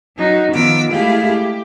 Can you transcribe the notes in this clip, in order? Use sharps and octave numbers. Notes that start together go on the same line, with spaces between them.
F#3 D#4 F#4
D#3 F3 B3 F4 D6 E6
G#3 A3 E4 G4 G#4 F5
G4